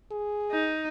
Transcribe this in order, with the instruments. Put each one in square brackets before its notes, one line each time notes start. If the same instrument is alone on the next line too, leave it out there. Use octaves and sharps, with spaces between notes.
[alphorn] G#4
[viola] D#4